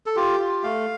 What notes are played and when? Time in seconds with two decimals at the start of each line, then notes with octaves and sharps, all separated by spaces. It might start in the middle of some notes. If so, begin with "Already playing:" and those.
0.06 A4
0.16 F4 G4
0.40 F4
0.63 A3 F5